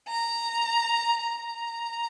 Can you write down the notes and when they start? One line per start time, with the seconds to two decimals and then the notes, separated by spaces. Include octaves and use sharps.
0.08 A#5
1.23 A#5